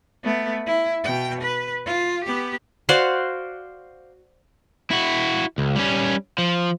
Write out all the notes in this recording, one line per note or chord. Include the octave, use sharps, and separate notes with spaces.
A3 B3
E4
B2 G5
B4
F4
B3 G4
F#4 C5 D5 F5
E4 F#4
C#2
G3 C#4
F3